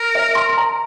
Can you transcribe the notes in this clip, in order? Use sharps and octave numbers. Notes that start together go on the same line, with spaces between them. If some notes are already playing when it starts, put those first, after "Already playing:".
Already playing: A#4
E5
C6
A#5